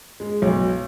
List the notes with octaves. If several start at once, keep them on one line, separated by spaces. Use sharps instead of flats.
G#3
B1